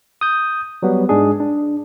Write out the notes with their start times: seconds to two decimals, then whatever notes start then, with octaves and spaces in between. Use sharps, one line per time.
0.21 D#6 G6
0.83 F#3 G3 B3
1.09 G#2 G#3 D4 G#4
1.40 D4